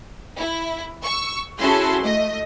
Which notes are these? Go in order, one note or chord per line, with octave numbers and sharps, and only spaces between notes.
E4
C#6 E6
C#4 E4 F#4 G#4 A4 C6
A3 D#5